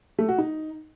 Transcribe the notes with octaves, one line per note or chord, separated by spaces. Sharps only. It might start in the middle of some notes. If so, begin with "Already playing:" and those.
A3
F#4
D#4